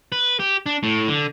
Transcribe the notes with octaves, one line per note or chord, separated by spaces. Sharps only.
B4
G4
D4
A2
D3